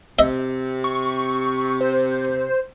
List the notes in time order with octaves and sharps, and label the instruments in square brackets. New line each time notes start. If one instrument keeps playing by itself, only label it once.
[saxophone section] C3 [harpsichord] D#5 E5
[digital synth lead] C#6
C5